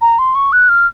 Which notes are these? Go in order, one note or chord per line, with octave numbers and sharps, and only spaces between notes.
A#5
C6
C#6
F#6
F6